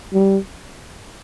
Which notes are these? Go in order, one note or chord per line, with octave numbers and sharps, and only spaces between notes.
G3